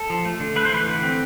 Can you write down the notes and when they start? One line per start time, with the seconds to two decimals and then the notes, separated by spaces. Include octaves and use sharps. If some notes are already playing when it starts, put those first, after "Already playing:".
Already playing: A4
0.10 F3
0.25 A3
0.40 D3
0.56 A3 B4
0.65 C5
0.72 E3 B4
0.87 D3
1.03 C4